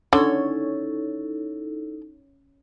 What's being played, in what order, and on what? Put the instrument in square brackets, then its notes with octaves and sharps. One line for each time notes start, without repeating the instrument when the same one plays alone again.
[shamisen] D3 [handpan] C#4 C#5 [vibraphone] D#4 E4 A4